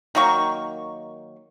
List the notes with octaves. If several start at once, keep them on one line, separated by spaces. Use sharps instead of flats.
D#3 F#3 A#3 C#6